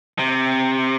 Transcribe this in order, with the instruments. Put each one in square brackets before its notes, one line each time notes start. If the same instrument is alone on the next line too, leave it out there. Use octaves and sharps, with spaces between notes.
[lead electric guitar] C3